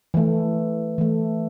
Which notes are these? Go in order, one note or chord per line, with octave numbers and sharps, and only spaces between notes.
E3 A3
E3 A3